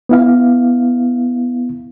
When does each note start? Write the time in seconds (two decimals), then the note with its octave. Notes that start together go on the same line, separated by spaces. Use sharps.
0.09 B3 E4 F5